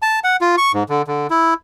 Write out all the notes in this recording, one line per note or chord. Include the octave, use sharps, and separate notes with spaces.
A5
F#5
F4
C#6
G#2
D3
D3
E4